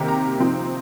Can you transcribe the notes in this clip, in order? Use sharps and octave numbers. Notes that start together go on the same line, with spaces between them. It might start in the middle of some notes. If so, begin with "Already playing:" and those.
Already playing: C3 D#3 A#3 G4
A#5
C3 F3 C4 D#4